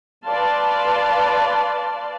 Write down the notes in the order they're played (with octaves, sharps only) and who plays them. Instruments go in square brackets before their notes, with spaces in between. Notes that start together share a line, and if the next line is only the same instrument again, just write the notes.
[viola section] B4 D5 F5 A5 C6